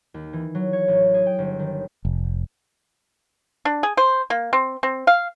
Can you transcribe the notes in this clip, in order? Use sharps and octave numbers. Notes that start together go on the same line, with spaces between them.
D#2
E3
F#3
C#5
A1
G#4
G5
G1
D#3
F1
D4
G#4
C5
A#3
C4
C4
F5